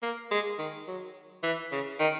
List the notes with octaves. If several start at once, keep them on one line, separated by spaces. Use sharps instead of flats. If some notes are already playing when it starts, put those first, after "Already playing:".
A#3
G#3
D#3
F#3
E3
C#3
D#3